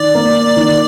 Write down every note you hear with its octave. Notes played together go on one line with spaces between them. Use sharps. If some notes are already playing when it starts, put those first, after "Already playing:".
Already playing: D#3 D5
A#3
D#3